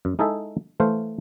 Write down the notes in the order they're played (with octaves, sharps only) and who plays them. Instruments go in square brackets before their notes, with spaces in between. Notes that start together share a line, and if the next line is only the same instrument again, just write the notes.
[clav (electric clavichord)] F#2
G#3 D#4 E4 G#4 A4 E5
E3 A3 C5 F5